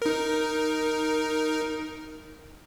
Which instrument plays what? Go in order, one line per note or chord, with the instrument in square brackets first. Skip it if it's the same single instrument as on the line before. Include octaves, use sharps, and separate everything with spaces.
[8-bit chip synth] D#4 A#4